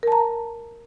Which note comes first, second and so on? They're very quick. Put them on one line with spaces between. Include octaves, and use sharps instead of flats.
A#4 A5 A#5